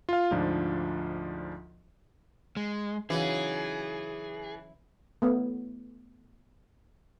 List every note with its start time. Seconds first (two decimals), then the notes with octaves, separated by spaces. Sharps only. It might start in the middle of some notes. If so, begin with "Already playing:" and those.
0.09 F4 F5
0.31 D2 G#2 F3 D4
2.57 G#3
3.10 C#3 E3 F#3 D#4 G#4
5.22 A3 B3